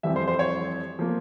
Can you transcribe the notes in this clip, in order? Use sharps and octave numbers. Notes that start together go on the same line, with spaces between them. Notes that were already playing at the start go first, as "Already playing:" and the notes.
F2 E3 G3 C4 E5
C5
C5
C#5
F3 A#3